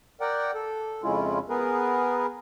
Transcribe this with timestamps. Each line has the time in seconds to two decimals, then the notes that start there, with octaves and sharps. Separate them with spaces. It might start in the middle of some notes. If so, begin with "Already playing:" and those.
0.21 A#4 D5 F#5 G5
0.54 A4
1.03 F2 C#3 G#3 C#4 E4 F4
1.49 B3 G#4 A#4 B4